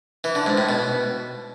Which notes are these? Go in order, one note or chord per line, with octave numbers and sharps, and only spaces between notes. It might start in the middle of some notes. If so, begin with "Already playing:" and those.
E3
D3
G#2
A2
B2